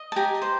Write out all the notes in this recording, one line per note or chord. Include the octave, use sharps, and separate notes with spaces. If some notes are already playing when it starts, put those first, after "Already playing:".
Already playing: D#5
A5
G4 G#5 A#5
C5